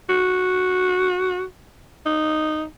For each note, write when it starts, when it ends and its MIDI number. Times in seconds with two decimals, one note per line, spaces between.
0.09 1.44 66
2.06 2.65 63